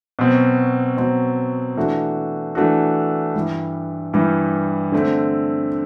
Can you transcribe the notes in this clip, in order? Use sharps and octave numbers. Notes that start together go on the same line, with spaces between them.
B2 F#3 C4
B2 F#3 C4
E3 A3 D4 F#4
E3 A3 D4 F#4
G2 E3 G3
G2 E3 G3
D3 A3 C4